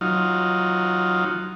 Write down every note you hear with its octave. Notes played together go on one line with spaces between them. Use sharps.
F#3 D#4 F4